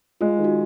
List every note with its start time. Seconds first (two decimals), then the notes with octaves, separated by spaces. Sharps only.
0.21 G#3 F4
0.39 D#3
0.44 F#4